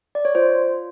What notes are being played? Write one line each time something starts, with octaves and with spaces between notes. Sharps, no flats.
D5
C#5
F4 C5